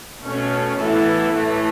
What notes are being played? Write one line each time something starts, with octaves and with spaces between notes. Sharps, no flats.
B2 A3 C#4
A2 E3 B3 E4 A4
A2 E3 A3